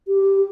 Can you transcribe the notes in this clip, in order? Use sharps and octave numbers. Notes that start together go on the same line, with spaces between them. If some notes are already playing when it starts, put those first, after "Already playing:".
G4